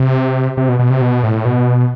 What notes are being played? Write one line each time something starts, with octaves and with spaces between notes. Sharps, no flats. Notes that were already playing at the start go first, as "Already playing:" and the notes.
Already playing: C3
C3
B2
B2
C3
B2
A2
B2